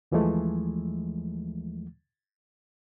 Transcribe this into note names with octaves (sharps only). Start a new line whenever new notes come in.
D#2 E3 F3 G#3 A3